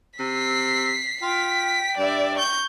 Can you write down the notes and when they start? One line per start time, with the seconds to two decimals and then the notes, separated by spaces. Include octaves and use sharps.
0.19 C3 E6 B6 C7
1.22 F4 G5 B6
1.98 G2 D5 E5
2.38 C#6 G6